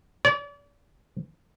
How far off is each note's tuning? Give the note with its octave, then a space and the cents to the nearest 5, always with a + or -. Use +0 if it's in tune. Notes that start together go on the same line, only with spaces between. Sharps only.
D5 -40